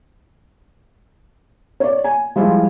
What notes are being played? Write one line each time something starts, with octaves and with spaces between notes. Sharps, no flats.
C#5 D5
G#5
F3 G3 G#3 E4 F4